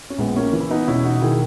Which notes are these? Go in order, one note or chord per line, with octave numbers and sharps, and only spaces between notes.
C#4
A#1 G#3 B3
A#3 C#4
E3
E4
B3 D#4
E1 C#4 E4
D#4 F#4
D#3 E4 G#4